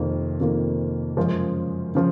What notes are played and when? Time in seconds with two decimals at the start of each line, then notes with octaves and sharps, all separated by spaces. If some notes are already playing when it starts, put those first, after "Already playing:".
Already playing: F2 C3 D#3 A#3 F4
0.40 F2 C3 D#3 A#3 F4
1.17 F#2 C#3 F3 G#3
1.95 C#3 F3